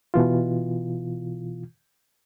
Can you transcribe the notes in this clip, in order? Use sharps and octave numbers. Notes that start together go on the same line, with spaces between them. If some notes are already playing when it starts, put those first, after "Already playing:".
B2 E3 F4